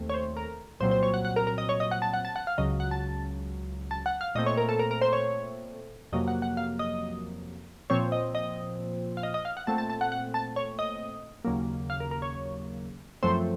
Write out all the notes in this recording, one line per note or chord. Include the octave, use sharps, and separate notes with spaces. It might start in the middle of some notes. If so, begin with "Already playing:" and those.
Already playing: D#2 A3 C4
C#5
C5
A#4
C2 A#2 F#3 C4 C5
C5
C#5
F#5
F#5
A#4
A#4
D#5
C#5
D#5
F#5
A5
F#5
A5
F#5
F5
C#2 C#3 F#3 D#5
F#5
A5
A5
F#5
F5
A#2 A3 C4 D#5
C#5
A#4
A4
A#4
A#4
C5
C#5
F2 C3 F#3 A#3 D#5
F#5
F#5
F5
D#5
A#2 F3 C4 C#5
D#5
D#5
F5
D#5
D#5
F5
F#5
A#2 A3 C4 A5
A5
A5
F#5
F#5
A5
C#5
D#5
D#2 C#3 F#3 A#3
F5
A#4
A#4
C#5
F#2 F3 A3 C4 C5